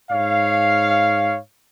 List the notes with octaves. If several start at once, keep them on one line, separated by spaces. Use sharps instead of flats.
G#2 C#5 F5